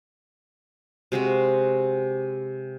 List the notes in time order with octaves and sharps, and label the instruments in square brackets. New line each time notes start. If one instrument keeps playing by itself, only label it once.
[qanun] C3 G#3 F#4 C5